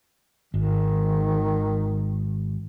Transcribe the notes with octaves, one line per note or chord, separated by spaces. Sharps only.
G#1 D#3